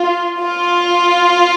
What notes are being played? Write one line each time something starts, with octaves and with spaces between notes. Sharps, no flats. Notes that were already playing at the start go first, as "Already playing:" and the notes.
Already playing: F4
F4